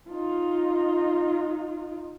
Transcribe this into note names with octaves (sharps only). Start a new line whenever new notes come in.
D#4 F4